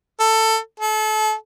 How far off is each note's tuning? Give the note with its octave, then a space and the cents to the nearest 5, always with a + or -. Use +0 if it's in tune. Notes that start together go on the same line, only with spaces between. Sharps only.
A4 +15
A4 -30